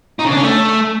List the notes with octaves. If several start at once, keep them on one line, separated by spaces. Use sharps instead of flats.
D#4
C#3
D4
C#4
A3